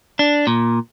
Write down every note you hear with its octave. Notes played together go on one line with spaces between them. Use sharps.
D4
A#2